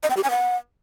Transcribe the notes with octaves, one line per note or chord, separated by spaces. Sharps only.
D#5
G5
G4
G#5
F#5